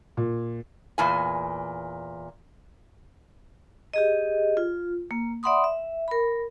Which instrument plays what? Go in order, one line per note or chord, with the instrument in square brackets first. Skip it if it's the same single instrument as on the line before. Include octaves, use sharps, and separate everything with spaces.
[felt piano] A#2
[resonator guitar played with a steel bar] E2 A#2 G#5
[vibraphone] G4 G#4 D#5
F4
A#3
D5 E5 F#5 B5 C6 D#6
E5
A#4 B5